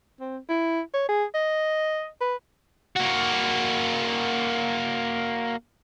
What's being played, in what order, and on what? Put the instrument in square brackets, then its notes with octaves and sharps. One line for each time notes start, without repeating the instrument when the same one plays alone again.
[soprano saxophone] C4
E4
C#5
G#4
D#5
B4
[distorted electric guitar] A#3 F#4